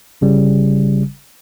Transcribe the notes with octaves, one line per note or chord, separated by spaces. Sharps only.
G1 C#3 G3